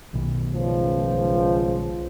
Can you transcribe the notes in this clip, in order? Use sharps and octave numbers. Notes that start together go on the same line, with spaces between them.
B1 B2 D#3
C#2 F3